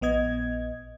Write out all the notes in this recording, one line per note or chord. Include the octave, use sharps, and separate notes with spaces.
A#1 B3 D#5 G#6